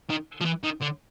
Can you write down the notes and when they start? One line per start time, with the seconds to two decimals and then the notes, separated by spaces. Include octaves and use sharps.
0.10 D#3
0.41 F3
0.45 E3
0.63 D#3
0.81 D3